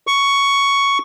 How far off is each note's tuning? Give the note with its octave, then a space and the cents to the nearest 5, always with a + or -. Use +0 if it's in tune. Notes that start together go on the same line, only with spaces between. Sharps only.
C#6 +5